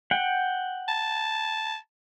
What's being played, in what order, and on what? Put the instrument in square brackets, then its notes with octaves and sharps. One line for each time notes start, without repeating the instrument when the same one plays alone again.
[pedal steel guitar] F#5 G5
[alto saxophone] A5